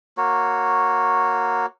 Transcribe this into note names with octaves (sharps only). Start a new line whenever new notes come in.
A#3 F#4 C#5